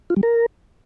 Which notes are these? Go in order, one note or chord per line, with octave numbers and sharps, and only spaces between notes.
F4
G3
A#4